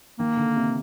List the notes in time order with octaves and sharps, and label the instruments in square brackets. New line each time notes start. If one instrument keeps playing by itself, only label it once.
[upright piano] D#3 [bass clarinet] A#3
[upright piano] D3
C3